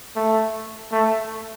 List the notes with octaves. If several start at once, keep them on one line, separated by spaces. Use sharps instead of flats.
A3
A3